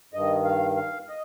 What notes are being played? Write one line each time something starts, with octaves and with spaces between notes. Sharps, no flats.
G2 D#3 D#5
F5
F5
D#5